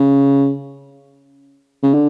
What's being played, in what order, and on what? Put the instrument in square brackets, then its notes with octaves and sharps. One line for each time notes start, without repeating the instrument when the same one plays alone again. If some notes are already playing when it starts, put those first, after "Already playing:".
Already playing: [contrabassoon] C#3
C#3
D3